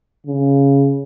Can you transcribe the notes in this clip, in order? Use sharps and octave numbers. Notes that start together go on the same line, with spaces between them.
C#3